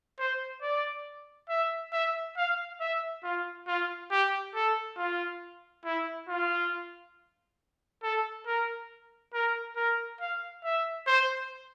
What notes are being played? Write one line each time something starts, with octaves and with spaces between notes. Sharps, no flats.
C5
D5
E5
E5
F5
E5
F4
F4
G4
A4
F4
E4
F4
A4
A#4
A#4
A#4
F5
E5
C5